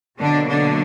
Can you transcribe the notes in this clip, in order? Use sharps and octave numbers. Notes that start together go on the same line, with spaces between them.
B2 D3 F#3 A#3 D4
D3 D4